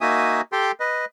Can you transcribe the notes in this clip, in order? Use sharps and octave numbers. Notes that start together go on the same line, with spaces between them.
A#3 D#4 F#4 E5 G#5 D#6
G4 A4 G5 C6
B4 D#5